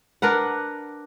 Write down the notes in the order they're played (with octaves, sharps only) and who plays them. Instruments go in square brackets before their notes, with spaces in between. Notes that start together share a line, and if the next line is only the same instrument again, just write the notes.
[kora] D4 A#4 B4 F#5